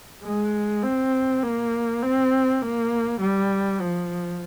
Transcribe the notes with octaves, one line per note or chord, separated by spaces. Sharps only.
G#3
C4
A#3
C4
A#3
G3
F3